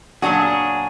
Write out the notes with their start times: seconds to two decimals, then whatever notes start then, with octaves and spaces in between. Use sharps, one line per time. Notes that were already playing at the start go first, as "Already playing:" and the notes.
0.22 A#2 F#3 D4 F#4 G#4